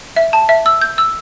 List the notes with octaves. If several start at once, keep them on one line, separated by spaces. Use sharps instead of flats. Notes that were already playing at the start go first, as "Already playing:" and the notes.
E5
A5
E5
E6
G6
E6